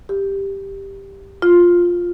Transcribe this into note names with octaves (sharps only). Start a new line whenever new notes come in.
G4
F4